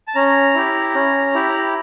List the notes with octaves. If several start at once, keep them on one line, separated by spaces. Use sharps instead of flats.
A5
C#4 A#5
E4 G4
C#4
E4 G4